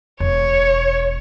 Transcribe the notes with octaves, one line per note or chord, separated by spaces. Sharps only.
E1 C#5